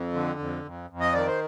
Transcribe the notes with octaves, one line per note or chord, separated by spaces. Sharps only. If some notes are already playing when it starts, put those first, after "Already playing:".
Already playing: F2
D3
F2
F2
F2
D#5
D#3 D5
C5